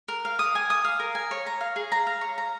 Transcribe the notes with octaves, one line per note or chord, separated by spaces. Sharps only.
A#4
F5
D#6
G#5
D#6
F5
A#4
G#5
C#5
A#5
F5
G#4
A#5
F5
C#5
A#5